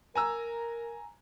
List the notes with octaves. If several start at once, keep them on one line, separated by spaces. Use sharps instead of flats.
A#4 G#5 A#5 E6